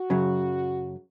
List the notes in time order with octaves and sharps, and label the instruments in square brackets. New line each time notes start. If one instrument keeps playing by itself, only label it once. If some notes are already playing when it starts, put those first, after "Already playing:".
Already playing: [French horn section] F#4
[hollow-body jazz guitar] F#2 C#3 F#3